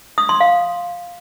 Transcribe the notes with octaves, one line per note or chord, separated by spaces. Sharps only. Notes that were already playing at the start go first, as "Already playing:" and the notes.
D#6
C6
F5